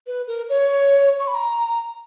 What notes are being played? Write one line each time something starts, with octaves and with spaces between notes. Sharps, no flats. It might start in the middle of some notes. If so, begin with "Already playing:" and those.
B4
A#4
C#5
C#6
B5
A#5